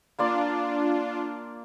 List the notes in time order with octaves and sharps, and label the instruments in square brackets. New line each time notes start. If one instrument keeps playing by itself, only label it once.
[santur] A#3 D5 C6 [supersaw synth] D4 F4